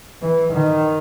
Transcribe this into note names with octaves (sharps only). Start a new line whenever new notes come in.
E3
D#3